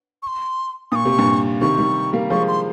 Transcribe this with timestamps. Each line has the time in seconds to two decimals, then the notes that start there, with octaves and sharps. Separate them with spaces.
0.23 C#6
0.27 C6
0.92 A#2 C#6 D#6
1.05 C3
1.18 G2 A#2
1.61 C3 D#3 C#6
1.78 D#3 G3
2.13 G3 A#3
2.30 F3 G#3 C#6
2.48 C6